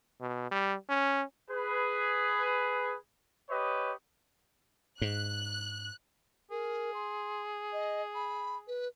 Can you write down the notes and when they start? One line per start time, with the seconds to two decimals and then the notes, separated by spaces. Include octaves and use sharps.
0.20 B2
0.51 G3
0.89 C#4
1.50 G#4 B4
3.50 G4 B4 C#5 D#5
5.02 G#2 F#6
6.51 G#4 A#4
6.94 C6
7.73 D#5
8.15 B5
8.68 B4